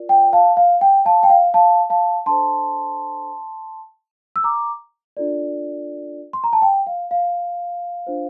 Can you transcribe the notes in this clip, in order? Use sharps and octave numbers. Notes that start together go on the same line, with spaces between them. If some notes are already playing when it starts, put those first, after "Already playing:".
Already playing: F4 A#4 D5
G5
F5 A5
F5
G5
F5 A5
G5
F5
F5 A5
F5 A5
D4 A4 C5 A5 C6
E6
A#5 D6
D4 F4 A4 D5
C6
A#5
A5
G5
F5
F5
D4 F4 C5